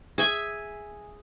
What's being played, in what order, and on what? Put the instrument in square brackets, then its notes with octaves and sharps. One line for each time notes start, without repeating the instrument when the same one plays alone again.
[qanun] G#4 E5 G#5